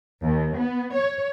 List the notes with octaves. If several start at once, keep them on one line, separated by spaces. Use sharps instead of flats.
D#2
B3
C#5